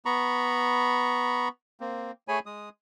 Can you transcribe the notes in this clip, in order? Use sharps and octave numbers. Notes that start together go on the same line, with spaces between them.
B3 A#5 B5 C#6
A#3 C4
A3 G#4 C#5 G#5 B5
G#3 D#6